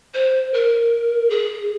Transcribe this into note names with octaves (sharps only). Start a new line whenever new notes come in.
C5
A#4
G#4